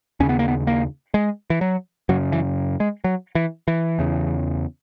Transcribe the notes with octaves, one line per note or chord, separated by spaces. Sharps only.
D#2 C#3 C#4
B3
A#3
B3
A#3
G#3
E3
F#3
F#2 C#3 F#3
E3
G#3
F#3
E3
E3
E2 C#3